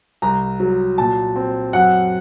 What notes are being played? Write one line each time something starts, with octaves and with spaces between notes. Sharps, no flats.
C2 A#5
F#3
A#2 A5
C4
F#2 F#5